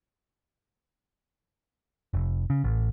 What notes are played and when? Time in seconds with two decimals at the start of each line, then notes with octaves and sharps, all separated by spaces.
2.13 F1
2.50 C#3
2.64 A1